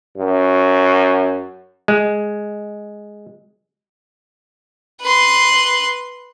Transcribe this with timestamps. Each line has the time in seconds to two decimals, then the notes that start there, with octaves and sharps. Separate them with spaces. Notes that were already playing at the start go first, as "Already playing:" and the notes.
0.17 F#2
1.88 G#3
5.01 B4 C6